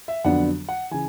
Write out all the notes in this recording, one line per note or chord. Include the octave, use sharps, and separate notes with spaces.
E5
F2 D3 F#3 B3 D4 F#5
F#5
C#3 E3 G#5